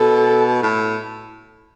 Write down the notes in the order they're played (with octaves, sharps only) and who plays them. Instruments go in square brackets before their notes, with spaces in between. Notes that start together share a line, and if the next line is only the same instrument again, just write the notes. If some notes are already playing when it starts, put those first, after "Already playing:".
Already playing: [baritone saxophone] B2 [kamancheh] A4
[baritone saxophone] A2